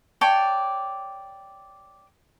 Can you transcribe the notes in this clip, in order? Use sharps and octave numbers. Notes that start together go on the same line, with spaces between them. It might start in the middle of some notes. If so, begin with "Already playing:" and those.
C#5 D5 G5 A5